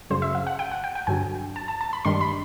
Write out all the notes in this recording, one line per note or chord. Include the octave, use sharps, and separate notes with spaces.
F#2 C#3 F#3 C5
E5
F5
F#5
G5
F#5
G5
G5
G2 D3 F#3 G#5
A5
A5
A5
B5
G2 D#3 G3 C6
B5